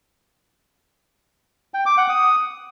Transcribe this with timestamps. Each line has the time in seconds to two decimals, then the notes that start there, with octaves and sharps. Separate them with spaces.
1.74 G5
1.86 D6
1.98 F#5
2.09 D#6